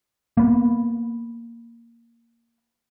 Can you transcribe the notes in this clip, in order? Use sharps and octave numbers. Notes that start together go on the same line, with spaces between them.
A#3 B3